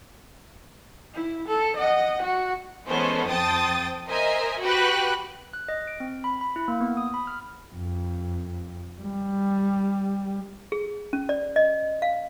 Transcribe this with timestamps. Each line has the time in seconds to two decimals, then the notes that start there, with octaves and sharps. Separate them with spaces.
1.14 E4
1.48 A4
1.76 D#5 F#5
2.22 F#4
2.88 E3 G#3 B3 C#4 A4 C5
3.28 F2 C5 G5 A5 D#6 A6
4.08 A#4 C5 D#5 E5 G#5
4.62 F#4 G4 B4 G5 F#6
5.53 F#6
5.69 D#5
5.87 D7
6.00 C4
6.24 B5
6.41 B5
6.56 E4
6.68 A#3
6.81 B3
6.97 D#6
7.14 B5
7.27 F6
7.72 F2
9.01 G3
10.72 G#4
11.13 C#4
11.29 D5
11.56 D#5
12.02 F5